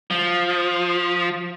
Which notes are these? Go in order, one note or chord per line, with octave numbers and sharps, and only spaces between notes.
F3